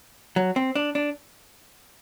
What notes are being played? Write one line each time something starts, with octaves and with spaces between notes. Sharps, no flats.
F#3
C4
D4
D4